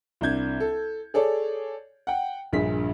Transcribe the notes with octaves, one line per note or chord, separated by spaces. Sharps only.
C2 D4 G6 G#6
A4
G#4 A4 C#5 D5
F#5 G5
A#1 G2 A#2 G#4 B6